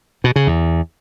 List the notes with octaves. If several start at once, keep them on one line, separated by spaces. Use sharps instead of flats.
B2
C#3
E2